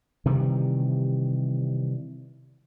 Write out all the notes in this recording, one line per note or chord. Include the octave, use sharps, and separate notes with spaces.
C3 D#3 E3 G3